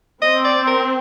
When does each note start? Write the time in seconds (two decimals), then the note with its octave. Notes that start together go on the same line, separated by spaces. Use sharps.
0.22 C4 D#5
0.45 D5
0.67 A#4